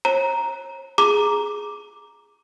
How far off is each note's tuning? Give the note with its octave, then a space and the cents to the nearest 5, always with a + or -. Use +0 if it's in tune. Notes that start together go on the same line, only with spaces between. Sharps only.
C#5 -45 A#5 +0
G#4 +5 A#5 +0 D6 +0